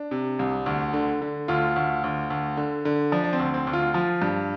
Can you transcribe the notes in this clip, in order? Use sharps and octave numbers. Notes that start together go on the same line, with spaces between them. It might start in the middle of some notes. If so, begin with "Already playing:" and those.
Already playing: D4
C3
C2
D2
D3
D3
D2 F4
D2
D2
D2
D3
D3
F3 D4
D4
C4
D2
C4
D2
F4
F3 F4
G2